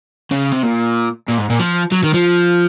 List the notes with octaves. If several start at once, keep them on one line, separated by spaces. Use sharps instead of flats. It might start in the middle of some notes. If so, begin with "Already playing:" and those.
C#3
C3
A#2
A#2
G#2
A#2
F3
F#3
D#3
F3